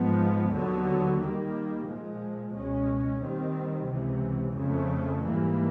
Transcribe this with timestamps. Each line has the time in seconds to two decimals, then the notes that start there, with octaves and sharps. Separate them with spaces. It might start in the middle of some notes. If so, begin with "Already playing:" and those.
Already playing: G#2 F3 G#3 B3
0.51 D#2 D3 F#3 B3
1.19 D#2 D#3 G3 A#3
1.86 A#2 F3 G#3
2.53 C#2 B2 G#3 C#4
3.21 D#2 D#3 G3 C4
3.88 C#2 C3 E3
4.55 F2 C#3 F3 A3
5.24 G#2 E3 G3 A#3